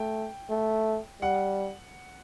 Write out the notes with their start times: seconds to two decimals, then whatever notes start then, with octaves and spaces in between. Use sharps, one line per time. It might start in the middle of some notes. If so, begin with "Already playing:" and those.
Already playing: A3 G5
0.49 A3
1.21 G3 F#5